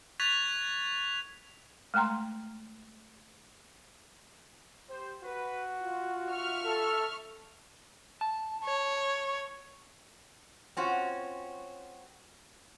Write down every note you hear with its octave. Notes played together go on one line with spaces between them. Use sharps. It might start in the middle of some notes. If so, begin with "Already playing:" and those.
C#6 F#6 G#6 A6 B6 F7
G#3 A3 G5 A#5 C6
G4 C5
F#4 B4
F4
E5 C#6 F6
A4
A5
C#5
C4 C#4 F4 F#4